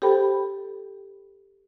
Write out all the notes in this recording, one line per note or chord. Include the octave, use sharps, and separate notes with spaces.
G4 A4 C5 G5 B5